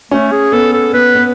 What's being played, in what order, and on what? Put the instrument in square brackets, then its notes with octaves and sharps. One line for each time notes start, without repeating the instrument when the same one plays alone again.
[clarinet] A3 [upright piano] C#4
[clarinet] G#4
[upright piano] B3 [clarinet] A4
[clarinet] A4
[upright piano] B3 [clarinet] B4
[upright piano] B3